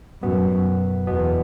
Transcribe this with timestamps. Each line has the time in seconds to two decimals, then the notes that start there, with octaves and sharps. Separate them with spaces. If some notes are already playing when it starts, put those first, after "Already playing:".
0.22 F#2 B2 B3
1.07 E2 B2 B3